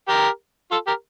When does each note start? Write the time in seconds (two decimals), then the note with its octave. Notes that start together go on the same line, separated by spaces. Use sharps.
0.08 G4 A#4
0.71 F4 A4
0.87 G4 A#4